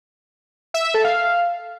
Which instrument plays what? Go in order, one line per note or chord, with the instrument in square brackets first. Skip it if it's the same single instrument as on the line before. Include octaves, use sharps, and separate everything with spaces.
[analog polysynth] E5
E5
A4
F5